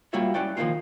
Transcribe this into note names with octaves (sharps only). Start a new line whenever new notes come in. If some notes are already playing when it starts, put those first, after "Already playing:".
G3 A#3 F4 F#4 C#5 E5
C#4 E4 B4 C#5 D5 G5
D#3 F3 G#3 A#3 D#4 F4